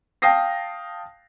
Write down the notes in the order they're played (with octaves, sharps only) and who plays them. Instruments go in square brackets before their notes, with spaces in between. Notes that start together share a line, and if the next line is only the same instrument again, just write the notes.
[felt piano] F5 G5 A5 D#6 A#6 C7